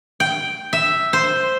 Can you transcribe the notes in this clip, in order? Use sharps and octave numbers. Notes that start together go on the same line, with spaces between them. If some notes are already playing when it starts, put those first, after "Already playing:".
G5
E5
C5